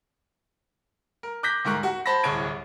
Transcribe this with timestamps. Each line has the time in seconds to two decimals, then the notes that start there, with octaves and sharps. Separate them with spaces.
1.23 A#4
1.43 D6 F#6 G6 A#6 B6
1.65 D2 G#2 A#4 C#6 F#6
1.83 F#4 F#5
2.06 C5 A5 B5 A#6
2.24 D1 C2 G#4 C#5 G#6 D7